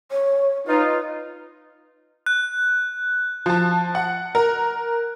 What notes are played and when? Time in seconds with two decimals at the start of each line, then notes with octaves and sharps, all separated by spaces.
0.11 C#5
0.67 D#4 F4 B4
2.26 F#6
3.46 F3 A5
3.95 F#5
4.35 A#4